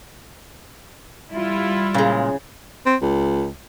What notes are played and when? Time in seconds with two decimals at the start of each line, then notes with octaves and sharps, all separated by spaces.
1.32 G3 E4 F4
1.94 A#2 C#3 G#3
2.86 C4
3.02 C#2